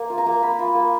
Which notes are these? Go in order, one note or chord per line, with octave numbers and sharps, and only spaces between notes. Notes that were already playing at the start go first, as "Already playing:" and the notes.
Already playing: A#3
F4
A#5
A#3
A#3 B5
F4
A#3